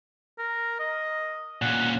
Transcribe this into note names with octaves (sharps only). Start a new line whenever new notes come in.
A#4
D#5
A#2 C#4 F#5